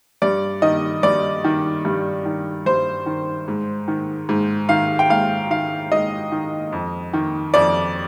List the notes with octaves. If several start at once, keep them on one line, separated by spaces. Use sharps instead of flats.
G2 D5
D#3 D#5
G2 D5
D#3
G2
D#3
G2 C5
D#3
G#2
D#3
G#2
D#3 F5
G5
G#2 F5
D#3 F5
G#2 D#5
D#3
F2
D#3
F2 D5